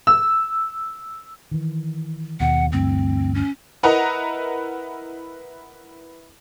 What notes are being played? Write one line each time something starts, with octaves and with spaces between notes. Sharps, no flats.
E6
D#3 E3
D#2 B2 F#5
D2 G2 E3 C4
C#4
E4 A#4 B4 D#5 F#5 A#5